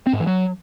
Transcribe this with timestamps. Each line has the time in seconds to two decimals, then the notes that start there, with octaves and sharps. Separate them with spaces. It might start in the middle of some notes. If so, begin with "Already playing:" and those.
0.07 C4
0.13 G#2
0.20 E3
0.27 F#3